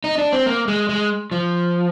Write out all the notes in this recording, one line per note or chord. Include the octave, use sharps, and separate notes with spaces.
D#4
D4
C4
A#3
G#3
G#3
F3